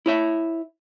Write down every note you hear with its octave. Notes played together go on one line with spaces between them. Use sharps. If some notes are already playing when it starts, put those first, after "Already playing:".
E4 C#5 E5